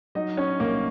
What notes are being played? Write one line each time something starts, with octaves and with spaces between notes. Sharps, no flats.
F#3 D#4 D#5
C#4 C#5
C2 A#3 A#4